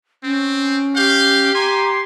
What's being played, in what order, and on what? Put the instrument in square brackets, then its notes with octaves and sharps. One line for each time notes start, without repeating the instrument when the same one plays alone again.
[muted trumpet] C4 [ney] C#4
[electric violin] G4 [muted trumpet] F5 [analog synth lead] G6
[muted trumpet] G#5 [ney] A#5 [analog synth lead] C6